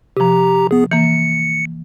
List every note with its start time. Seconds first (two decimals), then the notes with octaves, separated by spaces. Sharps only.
0.17 C3 F3 G4 A#5
0.71 B3 G#4
0.91 E3 A#3 C#7